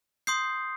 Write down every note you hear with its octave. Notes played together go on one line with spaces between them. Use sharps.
C6 D#6 G6 C7